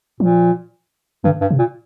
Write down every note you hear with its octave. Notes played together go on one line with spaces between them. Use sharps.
A#2 F3
G2 D3
G2
C3
A#2